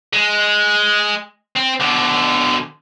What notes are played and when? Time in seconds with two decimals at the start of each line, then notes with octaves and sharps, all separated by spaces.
0.13 G#3
1.56 C4
1.81 B2 D3